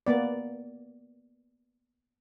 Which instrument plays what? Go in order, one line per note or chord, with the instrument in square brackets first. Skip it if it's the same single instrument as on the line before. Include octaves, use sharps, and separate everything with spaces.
[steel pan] A#3 B3 D5